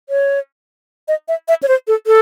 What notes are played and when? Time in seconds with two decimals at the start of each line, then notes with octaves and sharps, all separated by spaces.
0.09 C#5
1.08 D#5
1.28 E5
1.48 E5
1.63 C#5
1.68 C5
1.88 A4
2.07 A4